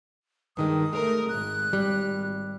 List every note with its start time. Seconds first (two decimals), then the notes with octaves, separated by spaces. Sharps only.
0.57 G2 D#3 G#3 D#6
0.93 G#3 A3 A#4
1.29 G#1 F#6
1.73 G3